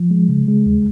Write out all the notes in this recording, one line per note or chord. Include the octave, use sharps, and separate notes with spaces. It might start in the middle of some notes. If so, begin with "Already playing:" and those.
Already playing: F3
G#3
C#3
G#3
D#2